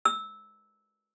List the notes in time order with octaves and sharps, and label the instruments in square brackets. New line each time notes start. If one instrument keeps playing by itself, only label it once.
[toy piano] E6